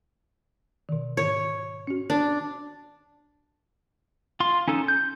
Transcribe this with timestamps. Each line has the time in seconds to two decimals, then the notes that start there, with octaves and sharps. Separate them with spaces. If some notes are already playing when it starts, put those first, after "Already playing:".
0.89 B2 D#3
1.17 G#2 D#3 C#5
1.87 C#4 F#4
2.10 D4
4.40 F4 C6
4.68 C#4 D#4 A4
4.88 G6